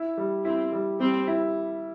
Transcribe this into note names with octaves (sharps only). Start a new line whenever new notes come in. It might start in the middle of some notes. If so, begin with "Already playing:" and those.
Already playing: E4
G3
C4 E4
G3
G3 C4
E4